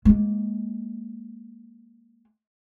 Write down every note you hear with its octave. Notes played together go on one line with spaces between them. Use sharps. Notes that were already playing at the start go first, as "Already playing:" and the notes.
G#3 A#3